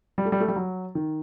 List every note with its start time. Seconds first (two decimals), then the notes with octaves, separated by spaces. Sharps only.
0.18 G3
0.25 A3
0.32 G3
0.40 A3
0.48 G3
0.56 F#3
0.95 D#3